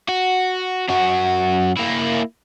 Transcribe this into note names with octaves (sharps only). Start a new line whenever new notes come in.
F#4
F#2 F#4
A#3 E4